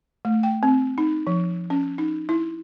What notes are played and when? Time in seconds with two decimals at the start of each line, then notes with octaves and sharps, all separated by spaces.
0.25 A3
0.43 G5
0.63 C4
0.98 D#4
1.27 F3
1.70 C#4
1.98 D#4
2.29 E4